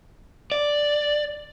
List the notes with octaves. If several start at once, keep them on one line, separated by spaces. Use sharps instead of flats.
D5